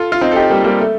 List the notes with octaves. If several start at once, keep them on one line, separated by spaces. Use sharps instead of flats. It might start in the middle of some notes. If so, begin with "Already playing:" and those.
Already playing: F4 A4
F4
C4 D#4
A4
D#4 G4
G3 A#3
G3 A#3
A3